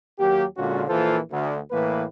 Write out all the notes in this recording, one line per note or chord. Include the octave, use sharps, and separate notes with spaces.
D#2 F#3 A#3 G4
A#2 D3 G#3 C#4 F4 F#4
A#1 E3 A#3 F4 A4 C5
D2
A2 E3 A#3 B4